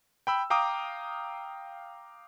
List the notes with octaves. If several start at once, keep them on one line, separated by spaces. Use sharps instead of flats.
G5 B5 E6
F5 G5 A#5 D6 D#6